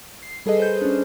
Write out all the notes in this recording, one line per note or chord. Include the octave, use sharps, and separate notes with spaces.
C7
G3 G#4 A4 B4 D#5
C5 G6
C#4 D4